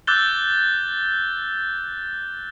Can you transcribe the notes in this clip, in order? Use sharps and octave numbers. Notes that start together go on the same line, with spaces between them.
D6 E6 F#6 G6 A6 G7